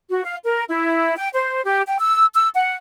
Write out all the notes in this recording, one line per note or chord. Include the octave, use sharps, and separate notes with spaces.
F#4
F5
A#4
E4
G5
C5
G4
G5
E6
E6
F#5